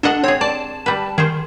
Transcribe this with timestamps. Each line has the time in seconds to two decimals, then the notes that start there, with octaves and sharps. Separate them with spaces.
0.03 D4 A4 D#5 F#5
0.24 C4 G#4 C#5
0.41 D5 A5
0.86 G3 B4
1.18 D#3 G#4 C5